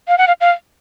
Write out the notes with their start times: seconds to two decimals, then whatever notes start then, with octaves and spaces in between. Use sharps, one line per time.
0.08 F5
0.18 F#5
0.27 F5
0.41 F5